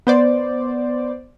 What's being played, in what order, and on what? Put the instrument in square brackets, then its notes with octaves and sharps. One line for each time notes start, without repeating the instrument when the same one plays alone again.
[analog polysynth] B3 C5 D5